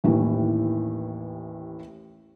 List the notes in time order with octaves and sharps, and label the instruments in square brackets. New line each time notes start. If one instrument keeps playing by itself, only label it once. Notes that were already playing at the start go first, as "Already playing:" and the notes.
[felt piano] A1 D#2 A2 E3